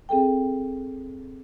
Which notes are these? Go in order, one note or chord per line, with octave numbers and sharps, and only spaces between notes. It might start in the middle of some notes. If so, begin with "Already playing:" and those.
C4 G#4 A4 G5